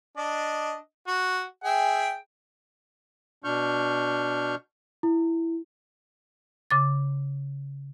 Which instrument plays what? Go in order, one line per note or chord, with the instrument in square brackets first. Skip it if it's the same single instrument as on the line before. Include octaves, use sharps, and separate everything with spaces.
[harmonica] D4 D#5
F#4
G#4 E5 G5
[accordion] B2 D4 C#6 F6 G6
[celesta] E4
[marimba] C#3 D6 A6